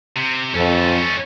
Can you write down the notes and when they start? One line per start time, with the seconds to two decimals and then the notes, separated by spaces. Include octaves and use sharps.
0.17 C3
0.54 F2 C#4 A4